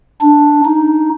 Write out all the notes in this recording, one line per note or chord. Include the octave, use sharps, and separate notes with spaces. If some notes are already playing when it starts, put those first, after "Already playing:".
D4
D#4